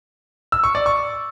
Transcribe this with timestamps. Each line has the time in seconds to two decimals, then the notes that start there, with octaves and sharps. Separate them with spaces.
0.52 E6
0.64 C#6
0.75 D5
0.86 C#6